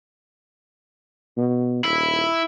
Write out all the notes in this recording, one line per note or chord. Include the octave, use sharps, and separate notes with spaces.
B2
D#1 E4